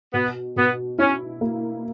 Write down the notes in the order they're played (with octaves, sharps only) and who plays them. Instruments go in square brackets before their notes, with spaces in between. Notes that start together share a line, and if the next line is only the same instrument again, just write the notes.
[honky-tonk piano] B2 [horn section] B3
[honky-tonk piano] B2 [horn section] B3
[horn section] C#4 [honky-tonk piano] E4
[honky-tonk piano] A#3